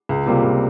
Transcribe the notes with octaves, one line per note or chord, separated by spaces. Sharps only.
C#2
C3 G3 A#3 F4
C#2